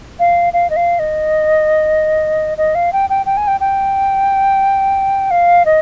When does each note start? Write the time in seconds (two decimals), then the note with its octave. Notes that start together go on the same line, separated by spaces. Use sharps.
0.19 F5
0.53 F5
0.70 D#5
0.76 F5
0.99 D#5
2.58 D#5
2.75 F5
2.93 G5
3.10 G5
3.26 G5
3.37 G#5
3.47 G5
3.60 G5
5.31 F5
5.65 D#5